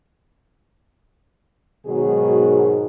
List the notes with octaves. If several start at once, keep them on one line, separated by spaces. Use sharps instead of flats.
G#2 B2 D#3 F#3 F#4 G#4